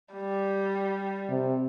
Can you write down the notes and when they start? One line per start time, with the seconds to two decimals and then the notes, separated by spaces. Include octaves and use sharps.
0.14 G3
1.30 C3